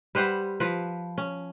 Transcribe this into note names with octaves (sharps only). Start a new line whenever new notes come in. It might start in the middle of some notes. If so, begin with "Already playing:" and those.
G3 B4 C5 F#5
F3 B4
C#4